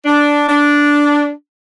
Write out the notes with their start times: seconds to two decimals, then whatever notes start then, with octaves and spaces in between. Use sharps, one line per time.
0.05 D4
0.49 D4